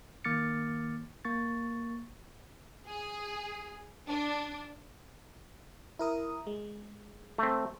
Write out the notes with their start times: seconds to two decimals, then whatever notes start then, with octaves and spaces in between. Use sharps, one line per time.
0.24 D#3 A#3 D6 F6 A6 C#7
1.25 A#3 C#6 A6
2.86 G#4
4.08 D4
5.99 E4 A#4 D#6
6.47 G#3
7.38 A3 C4